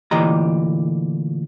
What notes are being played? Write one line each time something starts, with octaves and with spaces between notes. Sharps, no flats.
D2 A#2 E3 G4 D#5 A#5